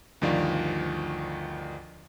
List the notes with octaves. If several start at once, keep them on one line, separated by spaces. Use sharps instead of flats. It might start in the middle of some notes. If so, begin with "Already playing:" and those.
D2 G2 D#3 F3 D5 F5